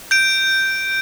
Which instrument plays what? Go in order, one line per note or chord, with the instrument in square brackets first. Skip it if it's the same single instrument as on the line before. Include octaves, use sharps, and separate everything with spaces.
[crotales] G6 D7